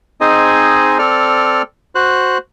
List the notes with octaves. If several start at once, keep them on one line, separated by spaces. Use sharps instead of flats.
C4 D#4 G#4 C5 D#5 G#5
C4 A4 D5 F6
F#4 C5 F#6